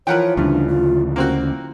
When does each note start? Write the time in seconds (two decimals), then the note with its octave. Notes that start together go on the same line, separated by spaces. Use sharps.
0.07 E3 F3 A#4 B4 C#5 F#5 G5
0.37 D2 G2 C#3 D4
0.68 F4
1.16 A#3 C4 C#4 F#4